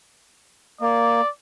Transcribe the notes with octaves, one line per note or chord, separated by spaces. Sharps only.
A#3 D5